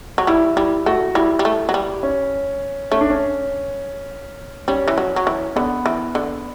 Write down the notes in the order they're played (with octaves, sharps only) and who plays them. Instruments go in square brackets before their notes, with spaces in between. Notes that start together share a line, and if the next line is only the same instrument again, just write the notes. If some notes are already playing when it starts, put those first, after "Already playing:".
[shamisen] F#3
[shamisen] G3 [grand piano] E4
[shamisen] G3 [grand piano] E4
[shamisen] A3 [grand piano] F#4
[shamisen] G3 [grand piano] E4
[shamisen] G3
A3
F#3
G3
[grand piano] C#4
[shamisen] A3 [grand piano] C#4
[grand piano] D4
C#4
[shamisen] G3 [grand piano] C#4
[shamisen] E3
F#3
F#3
E3
[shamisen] D3 [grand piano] B3
[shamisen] E3
D3